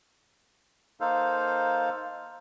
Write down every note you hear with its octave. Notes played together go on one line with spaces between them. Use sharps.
A#3 D#4 A4 C5 F5